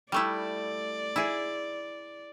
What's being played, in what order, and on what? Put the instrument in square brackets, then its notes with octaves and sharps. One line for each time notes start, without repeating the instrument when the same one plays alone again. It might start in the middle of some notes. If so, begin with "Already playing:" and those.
[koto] G3 A3 E4 [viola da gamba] D5
[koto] E4 G#4